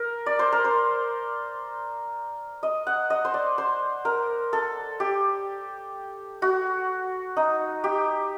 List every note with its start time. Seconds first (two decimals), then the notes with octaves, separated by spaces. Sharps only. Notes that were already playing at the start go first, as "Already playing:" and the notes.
Already playing: A#4
0.26 D5
0.39 C5
0.52 A#4
0.64 C5
2.63 D#5
2.87 F#5
3.10 D#5
3.25 C5
3.34 D5
3.58 C5
4.05 A#4
4.53 A4
5.00 G4
6.42 F#4
7.36 D#4
7.84 G4